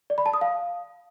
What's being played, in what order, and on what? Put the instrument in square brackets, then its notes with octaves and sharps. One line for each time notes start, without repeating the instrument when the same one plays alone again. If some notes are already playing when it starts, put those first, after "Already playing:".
[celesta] D5
B5
A5
D#6
F5